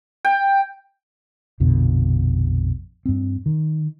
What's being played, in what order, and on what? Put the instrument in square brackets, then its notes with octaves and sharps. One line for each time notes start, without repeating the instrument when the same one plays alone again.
[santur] G5
[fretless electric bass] A#1 F2 B2 D3
G2 C4
D#3